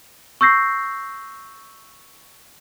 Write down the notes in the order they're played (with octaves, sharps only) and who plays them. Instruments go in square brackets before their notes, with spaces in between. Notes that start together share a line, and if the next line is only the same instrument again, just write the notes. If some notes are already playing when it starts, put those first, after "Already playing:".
[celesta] C#6 E6 G6 A#6 C7